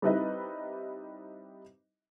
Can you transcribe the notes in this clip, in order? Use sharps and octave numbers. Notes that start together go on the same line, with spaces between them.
G3 C4 D#4 E4 B4 D#5